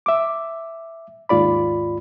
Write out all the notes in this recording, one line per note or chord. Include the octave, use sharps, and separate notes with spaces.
E5 D6
D#2 G#2 F4 D5 B5